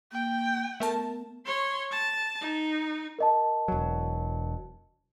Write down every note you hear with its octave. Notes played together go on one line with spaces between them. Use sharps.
A#3 G5
A3 B3 A#4 A5
C#5 C6
A5
D#4
A#4 D#5 A5
E1 F#3